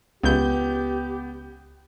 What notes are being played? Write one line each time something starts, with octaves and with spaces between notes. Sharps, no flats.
C#2 B3 G4 G6